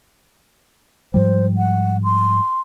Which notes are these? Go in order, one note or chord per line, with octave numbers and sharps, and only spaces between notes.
G#2 F3 G3 C5
F#5
C6